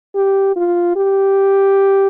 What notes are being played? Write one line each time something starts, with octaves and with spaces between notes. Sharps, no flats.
G4
F4
G4